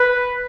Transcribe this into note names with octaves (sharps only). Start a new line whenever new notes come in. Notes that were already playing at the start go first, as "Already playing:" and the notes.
Already playing: B4